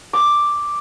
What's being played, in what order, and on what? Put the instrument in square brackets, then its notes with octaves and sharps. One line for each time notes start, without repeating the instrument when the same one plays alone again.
[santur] D6